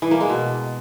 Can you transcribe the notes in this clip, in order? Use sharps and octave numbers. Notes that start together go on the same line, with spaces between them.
E3
A#3
G#3
B2